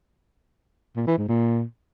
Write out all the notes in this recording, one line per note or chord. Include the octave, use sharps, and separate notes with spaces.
A#2
E3
G#2
A#2